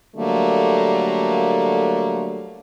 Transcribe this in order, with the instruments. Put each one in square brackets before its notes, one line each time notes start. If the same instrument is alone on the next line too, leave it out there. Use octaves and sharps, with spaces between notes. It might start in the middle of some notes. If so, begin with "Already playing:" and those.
[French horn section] D3 F#3 G3 A3 A#3